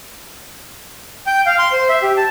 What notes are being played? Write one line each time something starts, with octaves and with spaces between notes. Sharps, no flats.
G5
F5
C6
C5
E5
G4
A5